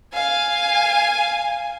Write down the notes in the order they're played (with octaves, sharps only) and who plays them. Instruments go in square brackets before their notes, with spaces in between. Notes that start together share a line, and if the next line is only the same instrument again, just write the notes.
[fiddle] F5 [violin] G#5